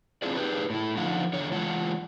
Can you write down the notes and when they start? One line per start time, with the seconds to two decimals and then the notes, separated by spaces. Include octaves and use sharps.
0.22 C4 D4 E4 F4 G#4 D5
0.36 D#4 G4 G#4 B4
0.70 A2 E4
0.97 D3 F3 D#4 F4 F#5
1.33 E2 D3 C#5
1.51 E3 G#3 F4 F#5